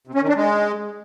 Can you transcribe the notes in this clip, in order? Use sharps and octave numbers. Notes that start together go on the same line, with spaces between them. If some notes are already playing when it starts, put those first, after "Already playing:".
C3
C#4
D#3
D4
G#3